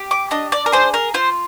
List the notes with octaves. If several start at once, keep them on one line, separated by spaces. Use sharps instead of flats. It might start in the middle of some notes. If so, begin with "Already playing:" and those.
Already playing: G4
D6
D4 D#5
D5
A#4
G#4 C5
A#4
F4 C5